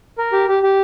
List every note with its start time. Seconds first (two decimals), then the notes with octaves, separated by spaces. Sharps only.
0.18 A#4
0.33 G4
0.48 G4
0.63 G4